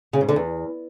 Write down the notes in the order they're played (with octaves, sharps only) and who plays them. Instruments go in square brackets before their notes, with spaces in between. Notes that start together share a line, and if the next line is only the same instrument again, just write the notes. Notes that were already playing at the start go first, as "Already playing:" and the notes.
[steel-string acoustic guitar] C#3
G#2
D3
E2